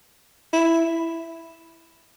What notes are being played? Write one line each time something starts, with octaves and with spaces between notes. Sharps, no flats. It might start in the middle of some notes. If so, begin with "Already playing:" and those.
E4